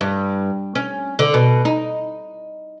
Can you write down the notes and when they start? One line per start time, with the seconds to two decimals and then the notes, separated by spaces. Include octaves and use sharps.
0.01 G2
0.75 C#4
1.19 D3
1.34 B2
1.65 D#4